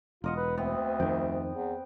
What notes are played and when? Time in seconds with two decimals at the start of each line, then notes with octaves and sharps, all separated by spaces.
0.24 E1 F4 A#4 D#5 F#5
0.37 B4
0.57 D2 B3 C4
1.00 F2 D#3 G5
1.53 E2